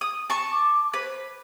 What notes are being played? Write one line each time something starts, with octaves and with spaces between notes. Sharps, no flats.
D#6
A5 C#6
D6
B4 C5